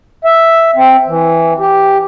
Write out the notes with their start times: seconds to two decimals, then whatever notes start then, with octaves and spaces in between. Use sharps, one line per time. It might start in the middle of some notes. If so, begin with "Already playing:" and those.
0.24 E5
0.76 C4
1.08 E3
1.60 G4